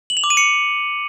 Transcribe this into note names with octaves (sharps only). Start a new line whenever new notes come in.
F#7
F7
D6
D#7
C#7